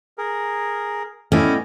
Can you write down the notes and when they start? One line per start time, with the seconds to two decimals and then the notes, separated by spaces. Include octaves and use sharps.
0.18 G#4 A#4
1.32 A3 B3 C#4 E4 D5 D#5 G5